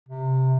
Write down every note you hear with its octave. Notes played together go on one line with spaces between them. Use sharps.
C3